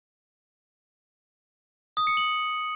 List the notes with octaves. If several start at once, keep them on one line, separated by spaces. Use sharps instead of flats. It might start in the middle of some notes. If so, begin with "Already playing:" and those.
D#6
C#7
F#7